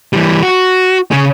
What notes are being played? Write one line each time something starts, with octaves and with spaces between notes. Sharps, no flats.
E3 G3
F#4
C#3 G#4